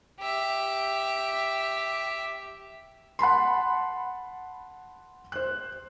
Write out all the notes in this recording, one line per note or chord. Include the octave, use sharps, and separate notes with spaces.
G4 E5
F#5 A5 B5 C6
C5 F#6